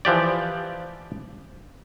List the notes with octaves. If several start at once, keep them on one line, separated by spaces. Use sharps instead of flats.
E3 F3 G4 D5